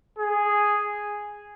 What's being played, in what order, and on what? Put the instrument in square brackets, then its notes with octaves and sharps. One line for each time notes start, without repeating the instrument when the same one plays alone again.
[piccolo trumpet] G#4